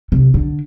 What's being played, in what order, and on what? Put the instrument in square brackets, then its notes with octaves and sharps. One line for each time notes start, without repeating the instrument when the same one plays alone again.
[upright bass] C3
D3